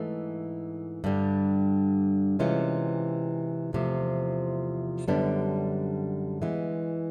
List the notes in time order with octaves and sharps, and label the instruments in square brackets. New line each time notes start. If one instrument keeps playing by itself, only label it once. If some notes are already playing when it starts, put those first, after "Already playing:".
Already playing: [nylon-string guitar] G#2 E3 A3
G2 D3 G3
C3 E3 G#3 C#4 F4
E2 C3 F3 A3
F#2 D3 G3 B3 D4
E3 G#3 B3